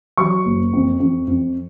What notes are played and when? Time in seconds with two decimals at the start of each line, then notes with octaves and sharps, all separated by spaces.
0.17 F#3 C#6
0.45 F#1
0.73 F2
1.00 F2
1.28 F2